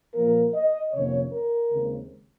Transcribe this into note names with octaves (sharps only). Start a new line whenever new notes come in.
A#2 F3 A#3 A#4
D#5
F2 C3 D#3 A#3 C#4 C#5
A#4
D#2 C#3 G#3 C4